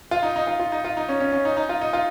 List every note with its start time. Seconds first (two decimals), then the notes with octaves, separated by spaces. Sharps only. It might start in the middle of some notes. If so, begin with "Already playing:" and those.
0.11 F4
0.23 D#4
0.36 D#4
0.47 F4
0.60 F4
0.72 D#4
0.85 F4
0.97 D#4
1.09 C#4
1.20 C#4
1.32 C#4
1.45 D#4
1.57 D#4
1.69 F4
1.81 D#4
1.93 F4